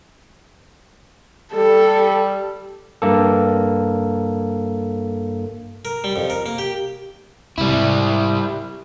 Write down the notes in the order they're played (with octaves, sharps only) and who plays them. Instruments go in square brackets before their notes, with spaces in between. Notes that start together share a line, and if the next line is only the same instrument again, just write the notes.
[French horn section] G3 [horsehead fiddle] A4
[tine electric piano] G2 A#3 A4
[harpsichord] A#4
G3
F2
A#4
A#3
G4
[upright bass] G#2 C3 [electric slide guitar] G3 E4